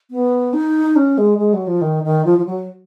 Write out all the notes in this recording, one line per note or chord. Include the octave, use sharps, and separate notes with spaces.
B3
D#4
C#4
G#3
G#3
F#3
F3
D#3
D#3
F3
F3
F#3